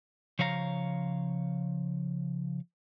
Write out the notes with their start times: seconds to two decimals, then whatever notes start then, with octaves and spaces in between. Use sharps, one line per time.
0.39 C#3 F3 C#5 F5 A#5